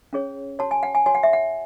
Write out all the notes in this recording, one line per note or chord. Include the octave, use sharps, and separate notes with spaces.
C#4 G#4 C#5
F#4 C#5 A5
G#5
F#5
G#5
F#4 C#5 G#5
F#5
E5
F#5